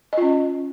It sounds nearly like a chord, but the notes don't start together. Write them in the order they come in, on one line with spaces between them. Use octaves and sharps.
D#5 F4 C#4